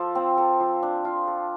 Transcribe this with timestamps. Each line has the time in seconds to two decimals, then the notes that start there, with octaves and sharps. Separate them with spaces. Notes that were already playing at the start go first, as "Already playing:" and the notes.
Already playing: F3 A4
0.15 C4
0.37 A4
0.60 F3
0.83 D4
1.05 F4
1.27 A4